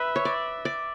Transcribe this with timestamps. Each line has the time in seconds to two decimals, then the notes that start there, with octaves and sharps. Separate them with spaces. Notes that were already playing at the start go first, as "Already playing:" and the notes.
Already playing: B4 E5
0.16 C#5
0.25 D5
0.65 D5